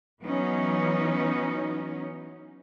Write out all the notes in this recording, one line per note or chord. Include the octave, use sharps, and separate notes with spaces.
E3 F#3 B3 C#4 D#4